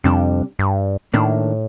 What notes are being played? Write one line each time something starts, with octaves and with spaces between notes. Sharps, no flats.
F2 C3 G3 D4
G2
A2 D#3 A#3 D4